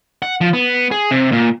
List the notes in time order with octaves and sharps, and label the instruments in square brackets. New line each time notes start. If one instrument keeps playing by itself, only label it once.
[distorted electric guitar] F#5
F3
B3
G#4
C3
A#2